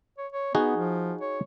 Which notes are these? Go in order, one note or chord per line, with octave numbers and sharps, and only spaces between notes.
C#5
C#5
B3 D#4 F#4 G#4
F3
C#5